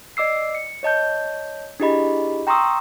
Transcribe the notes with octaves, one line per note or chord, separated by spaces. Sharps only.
D5 D#5 D6 E6 C7
C#7
C#5 D#5 A5 G6
D4 E4 G4 G#4 D#5 B5
G5 A#5 C6 C#6 D#6 E6